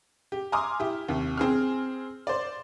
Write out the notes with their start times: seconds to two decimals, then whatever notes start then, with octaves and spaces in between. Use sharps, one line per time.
0.32 G4
0.52 G#5 A#5 C6 D6 D#6 F6
0.80 E4 G4
1.08 D#2 C3
1.38 C4 G#4 F6
2.27 C5 D5